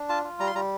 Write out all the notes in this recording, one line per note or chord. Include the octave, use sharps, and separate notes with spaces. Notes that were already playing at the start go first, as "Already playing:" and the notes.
Already playing: D4
F4 A5
F4
G3 A#5
C6
G3 A#5